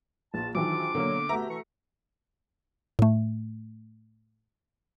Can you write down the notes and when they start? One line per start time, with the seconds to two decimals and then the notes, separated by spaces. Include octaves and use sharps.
0.34 A#1 E2 F4 A5
0.55 G#2 D#3 E3 F#3 D4 F4 D6
0.95 B2 D3 F#3 A#3
1.29 A3 B3 F#4 G4 E5 A#5
1.49 E3 C#6
2.99 A2 A3